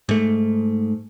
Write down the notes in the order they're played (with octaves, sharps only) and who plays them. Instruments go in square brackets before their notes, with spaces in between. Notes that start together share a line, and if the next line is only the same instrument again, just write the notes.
[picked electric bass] G#2 A3